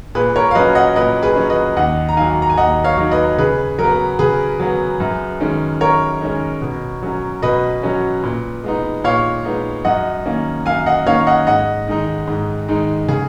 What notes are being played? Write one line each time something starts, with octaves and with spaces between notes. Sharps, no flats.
A#2 G#4 B4
A#4 C#5
F5
F#3 C#4 B4 D#5
D#5 F#5
A#2 B4 D#5
G#4 B4
F#3 C#4
B4 D#5
D#2 D#5 F#5
A#5
D#3 F#3 F5 G#5
A#5
G#5
D#2 D#5 F#5
C#5 F5
D#3 F#3
B4 D#5
C#3 G#4 B4
F#3 B3 A#4
C#3 G#4 B4
F#3 B3
F#2
D#3 G#3 C#4
F#2 A#4 C#5
D#3 G#3 C#4
B2
F#3 C#4
B2 B4 D#5
F#3 C#4
A#2
G#3 B3 D#4
A#2 C#5 F5
G#3 B3 D#4
F#2 D#5 F#5
D#3 A#3 C#4
F#2 F5 G#5
D#5 F#5
D#3 A#3 C#4 C#5 F5
D#5 F#5
G#2 D#5 F#5
D#3 G#3 D#4
G#2
D#3 G#3 D#4
C#3 G#4